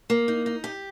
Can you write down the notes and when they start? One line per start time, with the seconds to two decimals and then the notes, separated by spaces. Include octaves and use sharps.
0.10 A#3
0.28 D#4
0.46 D#4
0.64 G4